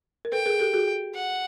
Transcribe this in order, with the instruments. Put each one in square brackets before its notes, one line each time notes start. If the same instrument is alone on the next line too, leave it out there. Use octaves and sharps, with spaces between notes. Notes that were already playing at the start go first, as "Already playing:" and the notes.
[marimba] A#4
[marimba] A4 B4 [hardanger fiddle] G5
[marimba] G#4 A#4
G4 A4
F#4 G#4
[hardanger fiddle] F#5